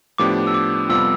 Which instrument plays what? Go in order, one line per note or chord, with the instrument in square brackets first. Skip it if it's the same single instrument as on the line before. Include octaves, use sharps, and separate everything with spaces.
[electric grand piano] A2 F3 B3 D4 G4 [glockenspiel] D6
[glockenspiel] E6
D6
[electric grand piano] F2 C3 G3 B3 F4 [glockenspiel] E6